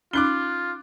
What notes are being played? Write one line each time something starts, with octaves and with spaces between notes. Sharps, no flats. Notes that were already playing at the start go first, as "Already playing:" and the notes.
C#4 D#4 F4 D6 F#6 G7